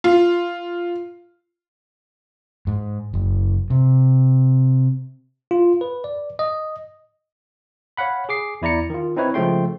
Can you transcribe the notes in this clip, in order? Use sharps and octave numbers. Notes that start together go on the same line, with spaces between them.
F4
G#2
F#1
C3
F4
B4
D5
D#5
C#5 F5 F#5 B5
G#4 D6 C7
E2 E4 D5 A#5 C#7
D#3 F4
C4 D#4 E4 B4 C#5
C#3 F3 G#3 A3 G5 C6